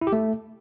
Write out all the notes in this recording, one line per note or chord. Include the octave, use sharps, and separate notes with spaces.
E4
G4
A3